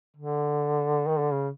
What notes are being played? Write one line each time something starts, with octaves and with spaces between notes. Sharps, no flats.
D3
D#3
D3
C#3